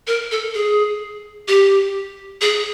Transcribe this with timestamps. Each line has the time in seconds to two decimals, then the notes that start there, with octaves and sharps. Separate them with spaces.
0.07 A#4
0.31 A4
0.54 G#4
1.48 G4
2.41 G#4